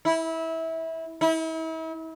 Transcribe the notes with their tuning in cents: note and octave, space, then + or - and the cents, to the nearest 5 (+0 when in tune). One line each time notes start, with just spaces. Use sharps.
E4 -20
E4 -40